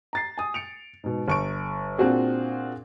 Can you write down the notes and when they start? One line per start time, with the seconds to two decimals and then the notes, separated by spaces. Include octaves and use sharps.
0.13 A#5 A6 C7
0.38 G#5 D#6
0.54 C#7 D7 F7
1.04 G#2 B2
1.28 G1 C#6 D7
1.98 A#2 C4 D4 F#4 G#4